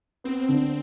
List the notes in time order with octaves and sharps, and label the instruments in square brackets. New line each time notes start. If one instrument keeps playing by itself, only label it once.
[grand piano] B3 [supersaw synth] C4
[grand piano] D3